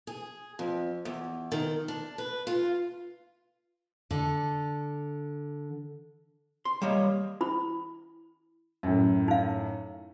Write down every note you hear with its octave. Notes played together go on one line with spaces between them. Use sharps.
G#4
F2
E2
D#3
D4
B4
F4
D3 A4
C6
G3 A#3 C#5 D#5
E4 B5
F#2 A2
D#4 F5